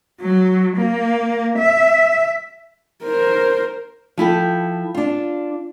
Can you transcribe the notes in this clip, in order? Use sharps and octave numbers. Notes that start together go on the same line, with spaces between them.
F#3
A#3
E5
A#4 C5
F3 E4 A4 G5
D4 F4